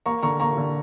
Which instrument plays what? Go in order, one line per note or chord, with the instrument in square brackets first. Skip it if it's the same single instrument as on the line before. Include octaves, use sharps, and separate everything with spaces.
[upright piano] A#3 [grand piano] A#5 C#6
[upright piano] D3 [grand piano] A#5 C#6
[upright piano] A#3 [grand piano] A#5 C#6
[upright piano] D3